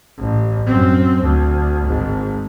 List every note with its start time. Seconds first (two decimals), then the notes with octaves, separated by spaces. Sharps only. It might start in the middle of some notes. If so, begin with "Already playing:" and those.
0.18 A1
0.66 F#2 C4
1.21 D2
1.86 G#1 G#2